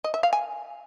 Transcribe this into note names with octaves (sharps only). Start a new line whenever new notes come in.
D#5
E5
F5
G#5